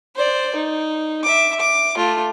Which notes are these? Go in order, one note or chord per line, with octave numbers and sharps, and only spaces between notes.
C5 D5
D#4
E5 D6
D6
A3 F4